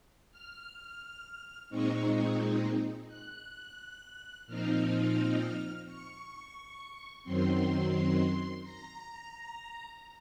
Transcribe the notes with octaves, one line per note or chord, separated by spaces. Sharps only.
F6
A#2 G#3 C4 D#4 C#6
F#6
A#2 F3 C4 D#4 F6
C#6
F#2 D#3 F#3 C4 C6
A#5